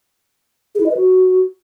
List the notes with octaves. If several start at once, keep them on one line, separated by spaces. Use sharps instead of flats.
G#4
E4
D#5
B4
F#4